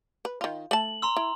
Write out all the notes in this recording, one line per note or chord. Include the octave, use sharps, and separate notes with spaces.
B4
D#3 F4
A3 A5 F#7
A#5 C6 E6
E4